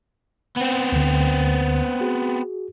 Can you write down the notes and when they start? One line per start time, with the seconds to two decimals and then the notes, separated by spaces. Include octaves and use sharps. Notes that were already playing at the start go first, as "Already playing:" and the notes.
0.56 B3 C4
0.92 D2 D3
2.01 F#4 G#4